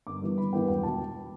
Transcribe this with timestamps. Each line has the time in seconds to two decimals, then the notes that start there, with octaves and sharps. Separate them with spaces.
0.07 G1 D6
0.22 G2 E3 G3 B3
0.37 G1 B5
0.53 G2 E3 G3 B3 G5
0.68 E1 G5
0.83 B2 A5